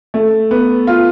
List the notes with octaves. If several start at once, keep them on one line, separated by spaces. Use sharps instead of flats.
A3
B3
F4